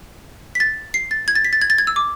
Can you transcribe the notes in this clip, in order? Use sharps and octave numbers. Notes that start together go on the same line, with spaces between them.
B6
A6
C7
A6
G#6
A6
B6
A6
G#6
A6
G#6
E6
D6